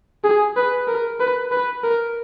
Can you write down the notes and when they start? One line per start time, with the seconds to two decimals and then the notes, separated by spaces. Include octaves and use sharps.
0.24 G#4
0.56 B4
0.88 A#4
1.20 B4
1.52 B4
1.84 A#4